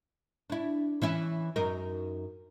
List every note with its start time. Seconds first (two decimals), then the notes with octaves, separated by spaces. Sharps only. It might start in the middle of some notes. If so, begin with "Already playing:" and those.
0.50 D4 E4
1.02 E3 C#4 E4
1.56 F#2 D#4 A#4